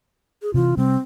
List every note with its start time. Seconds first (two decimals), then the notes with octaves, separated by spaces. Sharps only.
0.42 G#4
0.54 C3 E3 F4
0.77 C3 G3 C4